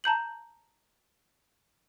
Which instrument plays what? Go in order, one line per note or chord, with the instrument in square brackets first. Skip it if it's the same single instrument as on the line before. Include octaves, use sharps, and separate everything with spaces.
[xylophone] A5 A#5 G6 F#7